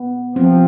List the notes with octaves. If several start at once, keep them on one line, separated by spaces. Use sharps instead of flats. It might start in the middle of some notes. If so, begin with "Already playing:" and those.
Already playing: B3
F3 C4